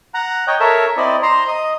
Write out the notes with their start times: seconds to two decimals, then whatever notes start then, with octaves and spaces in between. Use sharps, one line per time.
0.14 F#5 A#5
0.47 C#5 D#5 G5
0.60 A4 A#4 C#5 E5
0.97 C4 E4 D5 D#5
1.23 C5 A#5 C6
1.48 D#5 D#6